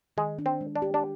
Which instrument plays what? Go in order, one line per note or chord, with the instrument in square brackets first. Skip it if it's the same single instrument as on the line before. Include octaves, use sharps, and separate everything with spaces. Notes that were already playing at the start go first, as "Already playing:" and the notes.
[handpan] D#3 [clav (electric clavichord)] G#3
[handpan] D4
[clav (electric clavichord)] C4
[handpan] G#3
[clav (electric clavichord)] D4
[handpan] G4
[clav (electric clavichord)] D4